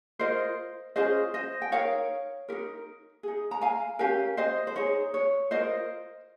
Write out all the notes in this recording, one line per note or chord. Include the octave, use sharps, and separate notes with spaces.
F4 A#4 C5 D#5
C#4 F4 G#4 C5 D#5
C5 D#5
G5
D#4 A#4 C#5 F5
D#4 G4 A#4
D#4 G#4
A#5
F5 G#5
C#4 G4 A#4 F5 G#5
C5 D#5
C5
D#4 G#4 C#5
C#5
F4 A#4 C5 D#5